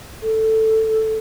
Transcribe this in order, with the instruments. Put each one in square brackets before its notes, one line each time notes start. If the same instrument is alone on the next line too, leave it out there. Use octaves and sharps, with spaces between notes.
[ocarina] A4